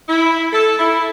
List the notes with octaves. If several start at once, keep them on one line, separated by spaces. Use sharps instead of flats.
E4
A4
E4